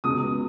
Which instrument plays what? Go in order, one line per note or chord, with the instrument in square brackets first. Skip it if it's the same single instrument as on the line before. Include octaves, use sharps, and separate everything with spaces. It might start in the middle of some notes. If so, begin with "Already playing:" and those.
[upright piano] C#2 B2 D#6